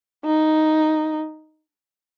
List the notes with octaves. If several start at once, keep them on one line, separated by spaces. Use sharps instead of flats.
D#4